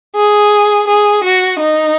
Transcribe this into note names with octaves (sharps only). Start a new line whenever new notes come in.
G#4
G#4
F#4
D#4